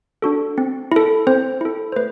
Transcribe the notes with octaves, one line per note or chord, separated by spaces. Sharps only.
D4 F#4 A4
C4
E4 A4
C4 C5
E4 A4
C5
A3 B4